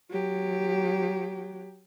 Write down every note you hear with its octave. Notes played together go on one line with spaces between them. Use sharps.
F#3 G4